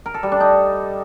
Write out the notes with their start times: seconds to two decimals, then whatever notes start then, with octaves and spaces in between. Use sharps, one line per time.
0.06 A#4
0.14 A4
0.23 G3
0.32 D4
0.40 D#4